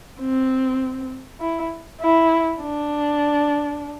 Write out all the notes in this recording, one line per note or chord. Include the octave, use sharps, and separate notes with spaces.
C4
E4
E4
D4